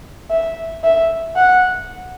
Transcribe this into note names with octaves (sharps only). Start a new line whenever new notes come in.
E5
E5
F#5